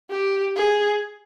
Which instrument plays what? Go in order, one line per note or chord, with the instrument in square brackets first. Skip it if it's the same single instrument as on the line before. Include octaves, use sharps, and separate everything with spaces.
[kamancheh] G4
G#4